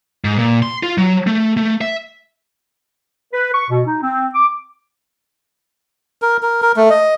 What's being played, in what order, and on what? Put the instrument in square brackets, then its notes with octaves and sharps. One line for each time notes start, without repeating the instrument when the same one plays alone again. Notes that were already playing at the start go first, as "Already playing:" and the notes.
[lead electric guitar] G#2
A#2
C6
F4
F#3
A3
A3
E5
[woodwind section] B4
C#6
B2
D#4
C4
D6
[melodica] A#4
A#4
A#4
A3
D#5